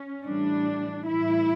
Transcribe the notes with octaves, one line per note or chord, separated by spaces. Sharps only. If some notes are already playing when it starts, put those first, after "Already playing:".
Already playing: C#4
A2 E3 G3 D4
A2 E3 G3 E4